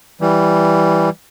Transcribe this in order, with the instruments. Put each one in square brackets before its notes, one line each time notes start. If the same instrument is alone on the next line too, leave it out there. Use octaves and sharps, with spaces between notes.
[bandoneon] E3 G3